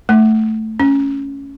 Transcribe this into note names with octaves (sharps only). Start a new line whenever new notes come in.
A3
C#4